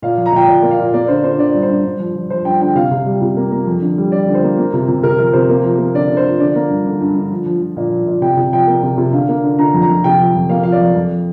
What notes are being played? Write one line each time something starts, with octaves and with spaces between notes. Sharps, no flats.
A#2 F5
F3
A#5
A#2 G5
A#2 D5
A#3
F5
A#2
A#3 D5
D3 C5
D3 C5
D3 D5
G2
C5
G2
G2
F3
F3
F3 C5
G2 G5
D3 G5
C3 F5
C3
G3
C3
A#3
A#3
F2
D3
G3
G3 D5
D3
C5
A#3
A#3
C3
C3
C3 A#4
F3 A#4
C3 C5
A#3
F3
A#3
D3 D5
D3
C5
F3
D3 D5
A#3
G2
D3
G2
D3
F3
F3
F3
A#2
F3
A#2
C3 G5
C3
F3 G5
A#3
C3
C3
D3 F5
A#3
D3
D3 A#5
F2
A#5
F2
C3 G5
F3
F2
A#3 F5
F3 F5
D5
F2
F2